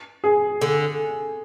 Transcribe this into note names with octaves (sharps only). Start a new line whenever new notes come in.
G#4
D3